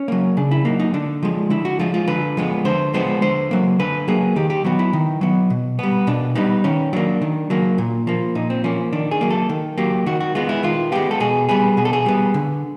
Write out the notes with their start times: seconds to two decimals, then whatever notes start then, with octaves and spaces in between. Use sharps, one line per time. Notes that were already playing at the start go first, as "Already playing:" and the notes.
Already playing: C#4
0.08 F#3 A#3
0.37 C#3 D4
0.51 E4
0.65 F#3 A#3 D#4
0.80 D#4
0.94 D3 D4
1.23 F3 G#3
1.50 D3 E4
1.65 F#4
1.80 F3 G#3 F4
1.94 F4
2.07 D3 B4
2.37 F3 G#3 B3
2.65 D3 C5
2.94 F3 G#3 B3 C5
3.22 D3 C5
3.51 F#3 A#3
3.80 D3 B4
4.08 F#3 A#3 G#4
4.36 D#3 G4
4.50 G4
4.64 F#3 B3 F#4
4.79 E4
4.93 D#3
5.21 F#3 B3
5.50 B2
5.79 G3 B3
6.07 B2 D4
6.35 G3 B3 D#4
6.64 D#3 C#4
6.93 F#3 A#3 D4
7.22 D#3
7.50 F#3 A#3
7.78 A#2
8.07 F3 A#3
8.35 A#2 D#4
8.50 C4
8.64 F3 A#3 C#4
8.93 D#3 D4
9.11 G#4
9.21 F#3 A#3
9.30 A4
9.49 D#3
9.78 F#3 A#3 G4
10.06 D#3 F#4
10.20 F#4
10.35 G#3 B3 F4
10.49 E4
10.63 D#3 F4
10.92 G#3 B3 G4
11.11 A4
11.20 B2 G#4
11.49 G3 B3 G#4
11.77 B2 G#4
11.85 A4
11.93 G#4
12.06 G3 B3
12.34 D3